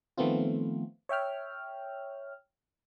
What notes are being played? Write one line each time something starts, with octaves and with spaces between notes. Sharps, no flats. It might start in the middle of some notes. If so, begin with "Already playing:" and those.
D#3 F3 A3 B3 C4 F4
C#5 E5 G5 F6